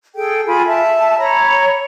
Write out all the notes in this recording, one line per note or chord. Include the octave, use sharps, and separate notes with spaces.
G#4 A4 G5
F4 G#5 B5
E5 A5
C#5 A#5 B5